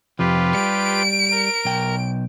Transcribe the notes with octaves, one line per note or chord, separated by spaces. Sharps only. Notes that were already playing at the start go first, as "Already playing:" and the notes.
F2 C3 F3 F4 G4 B4
G3 D7
A#4
B1 G5